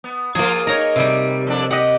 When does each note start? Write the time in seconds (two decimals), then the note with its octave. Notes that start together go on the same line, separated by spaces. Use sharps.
0.04 B3
0.35 F3 A#3 F4 G#4
0.67 D#4 A#4 C#5 A#5
0.96 C3 G3
1.47 F2 D4
1.71 G4 D#5 F#5